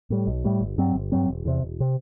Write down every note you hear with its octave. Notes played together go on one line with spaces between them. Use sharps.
A2 G3
B1
A2 G3
G1
G2 F#3 C4
G1
G2 F#3 C4
E1
E2 C3
E1
C3